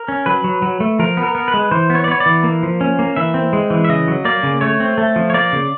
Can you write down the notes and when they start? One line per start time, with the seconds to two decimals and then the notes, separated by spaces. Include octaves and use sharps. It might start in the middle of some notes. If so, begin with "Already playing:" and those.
Already playing: A#4
0.08 C#4
0.26 F#3 B4
0.44 F#3
0.62 F#3
0.80 A3
0.99 F3 A#4
1.17 B3
1.23 A#4
1.35 B3
1.48 B4
1.54 G#3
1.71 E3 C5
1.90 B3
1.95 C#5
2.04 D5
2.08 B3 C#5
2.20 D5
2.26 E3
2.44 A#3
2.63 F3
2.81 C#4
2.99 A#3
3.16 E3 E5
3.34 C4
3.53 G#3
3.70 E3
3.84 E5
3.89 C#3 D#5
4.08 F#3
4.25 A#3 D5
4.43 C#3
4.61 A3 C#5
4.80 C4
4.98 A3
5.16 F3
5.30 C#5
5.34 A#3 D5
5.52 C#3